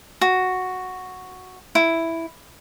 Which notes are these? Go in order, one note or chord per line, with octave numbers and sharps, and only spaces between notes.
F#4
E4